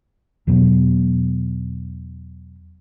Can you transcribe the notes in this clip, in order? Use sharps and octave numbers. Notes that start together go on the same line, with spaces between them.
E2 B2 F#3 B3